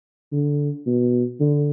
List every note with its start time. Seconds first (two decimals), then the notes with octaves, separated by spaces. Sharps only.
0.32 D3
0.86 B2
1.40 D3